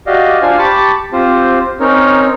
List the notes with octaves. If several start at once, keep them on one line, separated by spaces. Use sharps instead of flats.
F#4 G4 D5 D#5 F5
D4 F4 C5 F5 G#5
G4 A5 B5 C#6 D6
C4 F4 G4 C5
C4 C#4 D#4 A#4 C#5